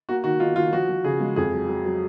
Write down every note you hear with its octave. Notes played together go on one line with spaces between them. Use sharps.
A#3 F#4
D#3 F#4
D#4 F4
D#3 F4
F3 F#4
F3
C#3 G#4
G#3
F2 G#4
F#3
F#3
F#3